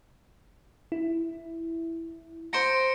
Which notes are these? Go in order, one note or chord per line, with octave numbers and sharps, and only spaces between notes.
E4
C5 A#5 A#6 C#7 D7